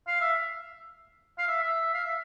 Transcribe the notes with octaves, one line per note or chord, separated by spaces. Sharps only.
F5
E5
F5
E5
E5
F5
E5